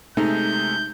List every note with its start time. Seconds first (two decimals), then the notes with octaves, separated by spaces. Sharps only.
0.17 C3 G#3 A3 D#4 G6